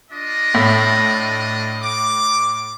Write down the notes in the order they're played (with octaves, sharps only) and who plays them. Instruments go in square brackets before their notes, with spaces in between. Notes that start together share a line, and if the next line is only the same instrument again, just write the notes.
[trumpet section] D4 F4 D#5
[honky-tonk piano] A2
[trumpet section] D6